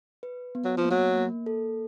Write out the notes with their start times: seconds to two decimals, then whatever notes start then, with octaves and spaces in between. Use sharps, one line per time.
0.23 B4
0.55 B3
0.65 F#3
0.77 F3
0.85 A#3
0.91 F#3
1.16 A#3
1.46 A4